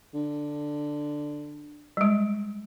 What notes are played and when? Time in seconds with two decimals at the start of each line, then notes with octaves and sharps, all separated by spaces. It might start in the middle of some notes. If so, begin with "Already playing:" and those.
0.14 D3
1.97 G3 G#3